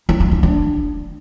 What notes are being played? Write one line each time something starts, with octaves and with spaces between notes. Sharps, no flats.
E4
F4
D4
D4